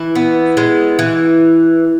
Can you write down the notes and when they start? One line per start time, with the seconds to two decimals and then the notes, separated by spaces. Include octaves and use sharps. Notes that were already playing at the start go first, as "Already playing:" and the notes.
Already playing: E3 E4
0.15 B3
0.57 G#3
0.99 E3